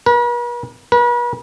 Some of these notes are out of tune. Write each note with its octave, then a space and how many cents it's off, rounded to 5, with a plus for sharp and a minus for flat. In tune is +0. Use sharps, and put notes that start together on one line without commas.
B4 -45
B4 -40